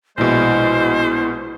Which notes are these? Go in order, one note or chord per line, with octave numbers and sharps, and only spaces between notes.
A#1 B2 G#3 E4 C5